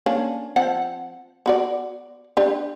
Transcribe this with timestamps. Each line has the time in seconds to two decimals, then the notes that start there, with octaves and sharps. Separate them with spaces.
0.06 A#3 C#4 D4
0.56 F3 C4 F#5
1.46 B3 F#4 D5
2.37 D4 G4